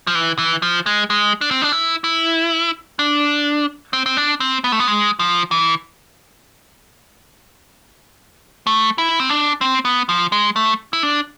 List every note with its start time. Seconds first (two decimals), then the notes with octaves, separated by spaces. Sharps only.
0.07 F3
0.15 E3
0.38 E3
0.62 F3
0.86 G#3
1.10 G#3
1.41 D4
1.51 C4
1.62 D4
1.72 E4
2.04 E4
2.99 D4
3.93 C4
4.06 C4
4.17 D4
4.40 C4
4.64 B3
4.72 A3
4.80 B3
4.88 G#3
5.19 F3
5.51 E3
8.67 A3
8.98 E4
9.20 C4
9.30 D4
9.61 C4
9.85 B3
10.09 F3
10.32 G#3
10.56 A3
10.93 E4
11.03 D4